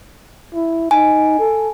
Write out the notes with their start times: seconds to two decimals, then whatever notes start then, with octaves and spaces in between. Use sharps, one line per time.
0.54 E4
0.91 D#4 G#5
1.39 A4